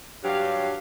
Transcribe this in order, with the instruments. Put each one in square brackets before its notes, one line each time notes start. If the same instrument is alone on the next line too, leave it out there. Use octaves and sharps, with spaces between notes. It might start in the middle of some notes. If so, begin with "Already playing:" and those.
[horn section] G2 F#3 F5 [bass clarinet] G4